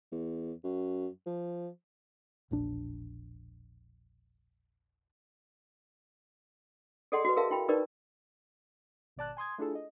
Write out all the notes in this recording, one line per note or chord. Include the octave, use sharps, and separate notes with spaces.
E2
F#2
F3
E1 A#1 D4
G#4 A4 D5 D#5 F#5 C6
F#4 B4
G#4 A#4 E5 F5 A5
E4 G5 B5
D#4 G4 A#4 B4 D5
G#1 B2 D5 A5 F#6
G#5 C6 D#6 G#6
A3 D4 E4 F4 G#4 A4
D#5